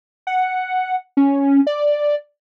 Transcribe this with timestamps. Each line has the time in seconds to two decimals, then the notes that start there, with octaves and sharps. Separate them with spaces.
0.27 F#5
1.17 C#4
1.67 D5